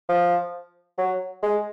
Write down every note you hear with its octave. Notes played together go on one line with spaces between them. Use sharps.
F3
F#3
G#3